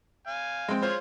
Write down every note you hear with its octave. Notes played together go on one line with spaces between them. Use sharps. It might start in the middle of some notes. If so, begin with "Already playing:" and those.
F5 G#5
G#3 C4
F4 G#4 C5 C#5